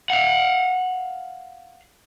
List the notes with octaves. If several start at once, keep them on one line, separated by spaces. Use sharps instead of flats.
F5 F#5